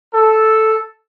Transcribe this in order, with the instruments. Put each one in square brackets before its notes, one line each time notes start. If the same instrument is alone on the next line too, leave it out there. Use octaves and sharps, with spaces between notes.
[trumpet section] A4